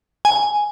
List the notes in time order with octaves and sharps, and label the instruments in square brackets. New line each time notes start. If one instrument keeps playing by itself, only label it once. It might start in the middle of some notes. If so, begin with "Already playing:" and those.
[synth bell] G#5